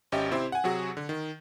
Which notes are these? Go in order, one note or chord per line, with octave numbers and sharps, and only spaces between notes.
G#1 C#4 G4 D#5 E5
C3 C4 E4 G4 C5
F#5 G#5
C3 F#3 F#4 G#4
D3
D#3